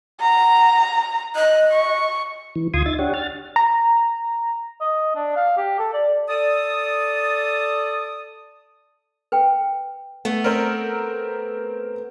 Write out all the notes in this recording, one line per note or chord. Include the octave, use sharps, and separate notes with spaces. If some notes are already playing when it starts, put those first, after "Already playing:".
F#5 A#5
D#5 F#6
C#6
E3
D2 F4 C6 D#6 G#6
D#4 E5 A6
D4 G4 C#5 F#5
F6 A6
A#5
D#5
D4
F5
G4
A4
D5
A4 D5 A5 D#6
B4 G5
A3 B3
C4 A#4